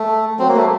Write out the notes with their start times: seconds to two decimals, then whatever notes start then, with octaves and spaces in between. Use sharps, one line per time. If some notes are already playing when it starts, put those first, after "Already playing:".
Already playing: A3
0.39 F#3 C4
0.49 A#3
0.56 A3